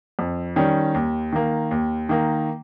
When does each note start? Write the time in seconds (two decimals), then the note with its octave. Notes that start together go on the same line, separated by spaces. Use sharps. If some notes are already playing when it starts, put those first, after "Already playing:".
0.19 F2
0.56 D#3 G3 C#4
0.94 D#2
1.32 D#3 A#3
1.71 D#2
2.09 D#3 A#3